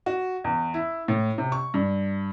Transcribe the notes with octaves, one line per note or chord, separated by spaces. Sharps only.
F#4
E2
E4
A2
C3
C#6
G2